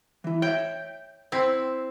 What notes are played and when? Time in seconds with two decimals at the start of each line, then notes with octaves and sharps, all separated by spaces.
0.24 E3 E4
0.42 C#5 E5 G5
1.32 C4 E4